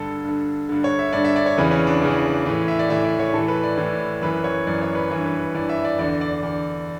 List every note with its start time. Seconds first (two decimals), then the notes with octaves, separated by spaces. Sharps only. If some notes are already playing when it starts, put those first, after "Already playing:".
Already playing: G2 D3 A4
0.24 G2 D3
0.69 G2 D3
0.84 C#5
0.99 E5
1.13 G2 D3 D5
1.25 E5
1.36 D5
1.46 C#5
1.57 E2 C#3 E3 B4
1.71 C#4
1.87 D4
2.02 E2 C#3 E3
2.46 A2 E3
2.68 E5
2.79 D5
2.90 A2 E3 E5
3.04 D5
3.19 C#5
3.33 A2 E3 A4
3.48 B4
3.63 D5
3.77 A2 E3
4.22 F#2 E3 B4
4.44 C#5
4.67 F#2 E3 D5
4.81 C#5
4.95 B4
5.11 G2 E3 C#5
5.26 B4
5.39 B4
5.54 G2 E3 D5
5.69 E5
5.84 D5
5.99 E2 D3 D5
6.21 D5
6.43 E2 D3